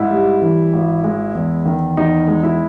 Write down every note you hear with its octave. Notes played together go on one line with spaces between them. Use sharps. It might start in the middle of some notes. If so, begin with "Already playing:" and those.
Already playing: G#2 E4
G3
E3
G#1
G#3
E2
D#3
E2 D#4
G#3
E4